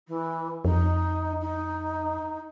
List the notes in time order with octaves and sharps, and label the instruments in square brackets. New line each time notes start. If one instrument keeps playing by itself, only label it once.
[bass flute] E3
[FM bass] F2 [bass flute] D#4
[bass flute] D#4